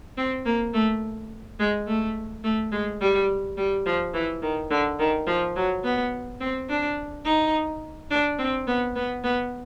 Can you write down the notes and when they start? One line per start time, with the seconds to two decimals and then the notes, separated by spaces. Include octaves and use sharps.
0.18 C4
0.46 A#3
0.74 A3
1.60 G#3
1.87 A3
2.44 A3
2.72 G#3
3.01 G3
3.58 G3
3.86 F3
4.14 E3
4.42 D#3
4.71 D3
4.99 D#3
5.27 F3
5.56 F#3
5.84 B3
6.41 C4
6.69 D4
7.25 D#4
8.11 D4
8.39 C4
8.67 B3
8.96 B3
9.24 B3